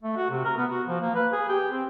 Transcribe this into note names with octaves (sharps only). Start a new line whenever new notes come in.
A3
F#4
C3
A#4
B3
F#4
F3
A#3
B4
G#4
G4
C4